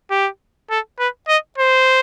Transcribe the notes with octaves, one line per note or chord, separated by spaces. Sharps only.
G4
A4
B4
D#5
C5